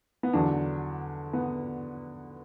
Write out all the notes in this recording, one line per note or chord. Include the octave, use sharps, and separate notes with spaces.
B3
E2 D3 F#3 D4
B3